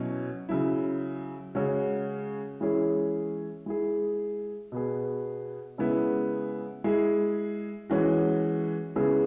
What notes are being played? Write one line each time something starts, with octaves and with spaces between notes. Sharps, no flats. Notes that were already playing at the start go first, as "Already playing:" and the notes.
Already playing: B2 F#3 C#4 E4
C#3 F#3 E4
C#3 G#3 C#4 F#4
E3 G#3 C#4 E4 G#4
G#3 E4 G#4
B2 B3 G#4
C#3 G#3 B3 E4
G#3 E4 G#4
E3 G#3 C#4 F#4
C#3 G#3 B3 E4 G#4